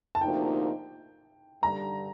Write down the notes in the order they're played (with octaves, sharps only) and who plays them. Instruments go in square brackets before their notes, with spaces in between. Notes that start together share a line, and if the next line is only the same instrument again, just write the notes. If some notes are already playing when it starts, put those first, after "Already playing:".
[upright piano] A5
[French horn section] D2 C3 F3 A#3 D#4 [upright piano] G5
[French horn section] G2 D3 G3 [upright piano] A#5